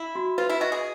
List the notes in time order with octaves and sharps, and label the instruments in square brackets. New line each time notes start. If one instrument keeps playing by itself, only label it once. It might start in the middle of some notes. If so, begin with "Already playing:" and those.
Already playing: [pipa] E4
[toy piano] F#4
[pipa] F4 [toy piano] B4
[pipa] E4
[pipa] F#4 [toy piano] D#5
[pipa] G#4